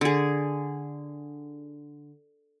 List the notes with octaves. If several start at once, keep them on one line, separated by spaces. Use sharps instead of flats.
D3 G#4